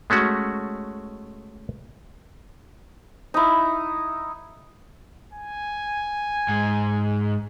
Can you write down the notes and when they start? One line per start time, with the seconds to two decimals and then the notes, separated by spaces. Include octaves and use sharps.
0.10 G#3 A3 C#4 F#4
3.34 D#4 E4
5.33 G#5
6.48 G#2